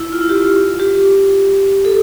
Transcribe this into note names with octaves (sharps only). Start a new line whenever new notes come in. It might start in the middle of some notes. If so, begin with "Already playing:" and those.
Already playing: E4
F4
E4
G4
F4
G4
A4